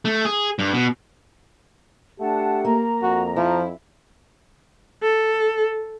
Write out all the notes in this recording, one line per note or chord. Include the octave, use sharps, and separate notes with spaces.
A3
G#4
G2
B2
A3 D4 G4 F#5 A5
A#3 A#5
F2 F#4
F3 E4
A4